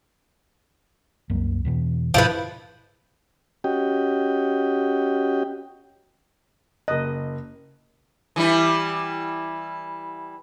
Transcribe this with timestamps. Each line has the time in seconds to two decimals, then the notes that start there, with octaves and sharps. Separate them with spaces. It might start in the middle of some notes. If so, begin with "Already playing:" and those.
1.30 C2 F#2 A#3
1.65 E2 B2 E3
2.14 G2 B2 D3 F3 E4 B4
3.64 C#4 F#4 G4 D#5 G5
6.88 F#1 D#5 F#6
8.36 E3 G3 E4